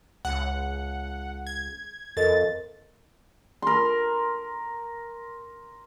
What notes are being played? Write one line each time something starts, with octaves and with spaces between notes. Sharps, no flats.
C#2 F#5
G#6
F2 A4 A#4 D#5 A6
A#4 C6